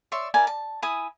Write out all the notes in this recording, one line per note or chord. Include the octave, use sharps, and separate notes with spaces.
C#5 D5 E5 C6
E4 A#4 D5 G#5
A5
E4 G#5 B5 D#6